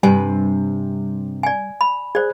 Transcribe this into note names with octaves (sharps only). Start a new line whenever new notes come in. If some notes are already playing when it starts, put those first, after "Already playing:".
G2 C3 G3 B4 G#5
D5 G#5
B5
G#4 C5 D5